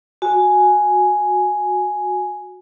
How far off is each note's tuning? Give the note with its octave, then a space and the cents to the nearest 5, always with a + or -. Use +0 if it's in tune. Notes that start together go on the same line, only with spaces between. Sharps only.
F#4 -10 G#5 +5